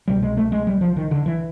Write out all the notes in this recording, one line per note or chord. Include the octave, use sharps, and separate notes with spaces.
C2 B2 G3
G#3
A3
G#3
G3
F3
D#3
D3
E3